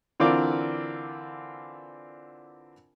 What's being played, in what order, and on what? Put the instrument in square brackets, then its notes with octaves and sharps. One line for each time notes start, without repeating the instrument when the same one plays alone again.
[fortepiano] D3 E3 C4 F4 A#4 D5